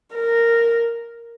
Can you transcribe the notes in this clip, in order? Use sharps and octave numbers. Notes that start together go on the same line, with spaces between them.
A#4